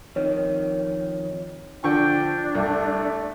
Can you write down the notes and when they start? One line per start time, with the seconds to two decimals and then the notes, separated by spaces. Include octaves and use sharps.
0.16 F2 D#3 C#5
1.84 D3 F3 D4 G5 C#6
2.55 C2 A3